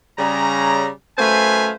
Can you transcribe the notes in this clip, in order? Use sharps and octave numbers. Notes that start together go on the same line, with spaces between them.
C#3 G3 A#5
F#2 A3 B4 C5 F5 G#5